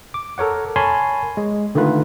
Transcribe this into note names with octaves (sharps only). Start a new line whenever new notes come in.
D6
A4 A#4 C#5 F#5
A#4 C#5 G#5 A5 B5 C6
G#3
D3 D#3 A3 F4 B4